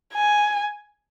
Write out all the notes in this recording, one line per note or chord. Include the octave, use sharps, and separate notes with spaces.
G#5